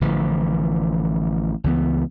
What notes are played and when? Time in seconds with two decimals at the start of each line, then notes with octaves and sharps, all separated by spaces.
0.01 A1 D3 E3 F3
1.64 C#2 E3 B3